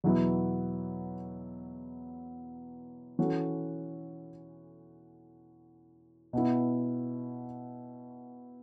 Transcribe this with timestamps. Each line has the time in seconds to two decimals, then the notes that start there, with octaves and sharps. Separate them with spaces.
0.04 E2 B2 F#3 B3 E4
3.19 E3 C#4 F#4 A4
6.33 B2 B3 E4